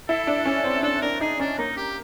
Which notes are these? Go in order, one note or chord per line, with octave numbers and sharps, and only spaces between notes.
E4 A4
D4
C#4
C4
D4 A4
D4 A#4
D#4 G#4
C#4 D4
A#3 D#4
G4